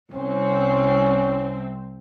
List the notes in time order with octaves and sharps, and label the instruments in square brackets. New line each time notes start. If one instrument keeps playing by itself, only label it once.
[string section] C2 C4 [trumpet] C#4